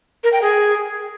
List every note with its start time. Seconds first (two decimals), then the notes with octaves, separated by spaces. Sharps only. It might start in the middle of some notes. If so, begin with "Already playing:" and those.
0.23 A#4
0.33 G5
0.42 G#4